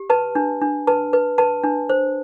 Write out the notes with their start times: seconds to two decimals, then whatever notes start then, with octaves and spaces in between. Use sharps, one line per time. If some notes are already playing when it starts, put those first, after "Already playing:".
Already playing: G4
0.10 B4 A5
0.35 D4
0.62 D4
0.87 B4 A5
1.13 B4
1.38 B4 A5
1.64 D4
1.90 C5